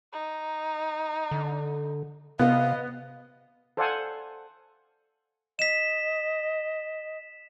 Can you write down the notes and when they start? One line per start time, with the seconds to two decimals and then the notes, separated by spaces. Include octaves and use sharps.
0.12 D#4
1.31 D3
2.39 C3 B3 D#5 F5
3.77 A4 C5 D5 F5 F#5 G#5
5.59 D#5 B6 E7